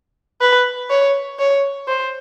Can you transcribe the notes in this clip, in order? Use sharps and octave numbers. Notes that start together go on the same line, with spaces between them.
B4
C#5
C#5
C5